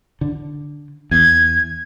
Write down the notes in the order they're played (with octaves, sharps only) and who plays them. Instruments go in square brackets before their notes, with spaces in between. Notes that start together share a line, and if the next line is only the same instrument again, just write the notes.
[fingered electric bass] D3
[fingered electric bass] E2 [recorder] G#6